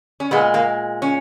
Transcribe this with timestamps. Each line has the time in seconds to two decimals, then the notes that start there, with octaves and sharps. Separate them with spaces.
0.20 C#4
0.31 A#2 G#3 B3
0.54 A#3
1.02 C#4